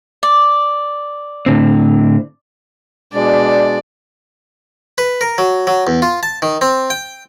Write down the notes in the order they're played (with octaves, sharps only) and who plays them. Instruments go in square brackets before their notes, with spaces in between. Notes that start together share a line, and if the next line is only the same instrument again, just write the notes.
[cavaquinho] D5
[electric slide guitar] A2 D3 C4
[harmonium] B2 G#3 D4 [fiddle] D5
[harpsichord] B4
A#4
F#3
F#3
E2
F4
A5
D#3
C4
G5